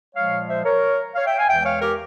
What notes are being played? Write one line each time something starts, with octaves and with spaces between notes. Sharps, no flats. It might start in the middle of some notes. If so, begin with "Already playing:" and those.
A#2 F3 G#3 C#5 F5
C5 E5
A#4 C#5
C#5 F5
E5 G5
F5 G#5
E2 E3 G#3 E5 G5
C#5 F5
G4 A#4